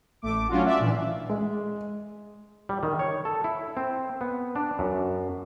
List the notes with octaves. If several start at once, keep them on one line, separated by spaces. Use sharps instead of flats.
A1 A3 D6
F#3 C#4 D4 F4 F#4
D5 E5
A#2 E3 D4
G#3
G3
D#3
C#5
A4
E4
C4
B3
D4
F#2